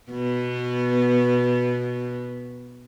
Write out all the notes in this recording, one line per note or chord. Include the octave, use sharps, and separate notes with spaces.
B2 B3